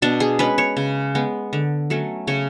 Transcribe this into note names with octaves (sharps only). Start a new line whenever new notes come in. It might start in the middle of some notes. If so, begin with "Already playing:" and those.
B2 D4
G#4
G#3 C#4 B4
C#5
C#3
G#3 B3
D3
F#3 A3 C#4
C#3 C#5